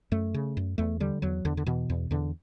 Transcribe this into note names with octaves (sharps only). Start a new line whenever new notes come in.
F#2 A3
C#3
F#2
E2 A3
D3 G3
E2 F#3
E2 D3
D3
B2 E3
E2
E2 D3